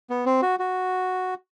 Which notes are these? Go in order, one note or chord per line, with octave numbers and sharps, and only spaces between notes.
B3
C4
F#4
F#4